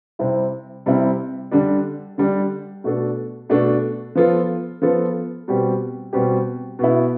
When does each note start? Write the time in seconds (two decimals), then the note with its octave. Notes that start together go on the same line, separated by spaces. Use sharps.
0.19 C3 G3 C4 E4
0.86 C3 G3 C4 E4
1.51 D3 G3 D4
2.18 D3 G3 D4
2.84 B2 A3 D4 A4
3.49 B2 A3 D4 A4
4.15 F3 B3 F4 A4
4.82 F3 B3 F4 A4
5.48 B2 G3 C4 G4
6.13 B2 G3 C4 G4
6.79 B2 B3 E4